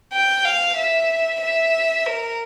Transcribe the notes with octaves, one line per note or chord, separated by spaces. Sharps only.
G5
F5
E5
E5
A#4